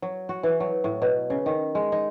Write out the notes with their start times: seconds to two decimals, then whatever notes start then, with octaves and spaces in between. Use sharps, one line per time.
0.02 F#3
0.29 F#4
0.43 E3
0.60 F#3
0.84 A2
1.02 B2
1.30 C#3
1.46 D#3
1.75 G#3
1.92 D#4